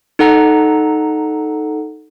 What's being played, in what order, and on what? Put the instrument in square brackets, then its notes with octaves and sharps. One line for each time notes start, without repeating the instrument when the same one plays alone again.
[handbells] D#4 A4 F#5 A#5